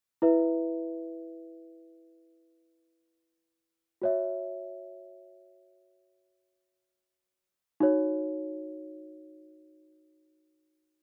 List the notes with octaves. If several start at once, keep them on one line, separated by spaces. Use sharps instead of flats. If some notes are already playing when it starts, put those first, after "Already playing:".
E4 B4 E5
F#4 C#5 E5
D#4 F#4 C#5